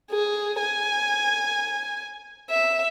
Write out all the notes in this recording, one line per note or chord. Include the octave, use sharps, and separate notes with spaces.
G#4
G#5
E5